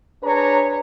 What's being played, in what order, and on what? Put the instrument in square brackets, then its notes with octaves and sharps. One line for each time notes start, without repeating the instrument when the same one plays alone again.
[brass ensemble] D4 G#4 B4 C#5 A#5